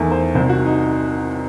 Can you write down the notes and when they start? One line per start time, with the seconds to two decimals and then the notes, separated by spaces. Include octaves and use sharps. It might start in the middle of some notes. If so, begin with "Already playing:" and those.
Already playing: E2 D#3 A3
0.12 C5
0.35 C2 C3 D#3 C5
0.49 F#4
0.66 D#4